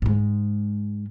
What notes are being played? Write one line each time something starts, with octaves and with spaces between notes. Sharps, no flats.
G#2 G#3